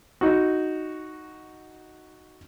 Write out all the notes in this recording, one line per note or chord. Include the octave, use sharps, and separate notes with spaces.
D#4 F#4